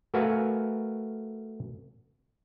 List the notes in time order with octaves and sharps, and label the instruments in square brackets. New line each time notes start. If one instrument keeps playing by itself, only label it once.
[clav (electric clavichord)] A3 F#4 A#4 B4 F5 G#5